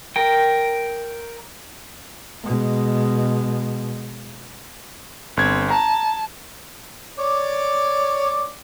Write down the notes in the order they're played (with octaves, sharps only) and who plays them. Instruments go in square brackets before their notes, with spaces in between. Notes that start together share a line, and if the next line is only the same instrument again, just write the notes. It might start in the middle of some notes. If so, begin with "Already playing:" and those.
[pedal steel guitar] A#4 G5
[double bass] B2 G#3
[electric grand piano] G1 G#6 [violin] C4
[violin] A5 [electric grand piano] A#5
[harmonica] C#5 D5 D6